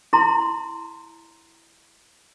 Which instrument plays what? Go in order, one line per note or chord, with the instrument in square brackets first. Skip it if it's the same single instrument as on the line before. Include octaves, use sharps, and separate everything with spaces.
[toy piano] E4 A#5 C6